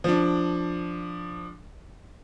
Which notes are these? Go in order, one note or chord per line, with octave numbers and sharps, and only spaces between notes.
F3 D4